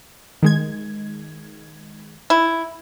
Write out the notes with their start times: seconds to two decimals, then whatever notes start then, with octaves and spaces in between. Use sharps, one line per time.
0.43 D#3 G#3 G#6
2.30 E4